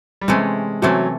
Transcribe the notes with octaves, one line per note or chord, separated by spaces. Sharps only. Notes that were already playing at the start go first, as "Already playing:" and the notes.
G3
C3 E3 G#3 A3 C#4
C3 E3 F#3 A3 C#4